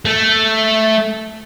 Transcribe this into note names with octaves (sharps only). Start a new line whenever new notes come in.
A3